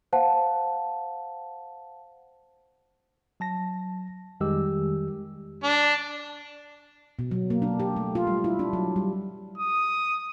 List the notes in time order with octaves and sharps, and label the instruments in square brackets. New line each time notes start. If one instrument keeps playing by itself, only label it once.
[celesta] C5 F5 F#5 A5
[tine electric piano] F#3 A5 A#6
F2 D#3 G3 G#3 G4 E6
[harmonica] D4
[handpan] B2
F#3
A#3
D4
G4
A3
F4
G3
E4
D4
F#3
G3
[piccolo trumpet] D#6